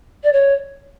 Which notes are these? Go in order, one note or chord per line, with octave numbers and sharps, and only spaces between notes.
D5
C#5